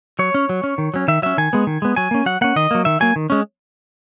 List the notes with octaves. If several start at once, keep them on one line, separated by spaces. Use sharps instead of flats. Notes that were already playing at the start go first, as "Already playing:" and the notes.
F#3 C#5
C#4
F#3
C#4
D#3
F#3 C#4
D#3 E5
F#3 C#4 E5
D#3 G#5
G#3 B3
D#3
G#3 B3
F#3 G#5
A#3 C#4
F#3 F#5
A#3 C#4 F#5
D#3 D#5
F#3 A#3
D#3 E5
F#3 A#3 G#5
D#3
G#3 C#4